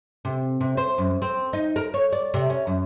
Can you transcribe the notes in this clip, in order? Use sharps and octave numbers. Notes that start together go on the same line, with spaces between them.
C3
C3
C5
F#2
C4
D#4
A#4
C#5
D5
C3
C#4
F#2